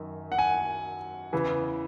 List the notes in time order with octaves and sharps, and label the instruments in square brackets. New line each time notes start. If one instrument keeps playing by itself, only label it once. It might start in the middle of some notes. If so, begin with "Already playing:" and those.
Already playing: [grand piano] F#2 D#3
F#5
G#5
E2 C#3 E3